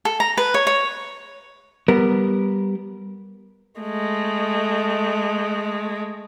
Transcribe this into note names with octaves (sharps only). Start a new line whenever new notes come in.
A4
A#5
B4
C#5
C#5
G3 B3 A#4
G#3 A3